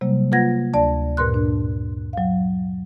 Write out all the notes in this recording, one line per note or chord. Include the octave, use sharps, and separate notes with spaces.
C3 F#3 G3 A#3
A#3 F4 B4 F#5 G#6 A#6
D2 D5 A5
G2 A#2 A#4 B4 C6 F#6
D4
F#3 F5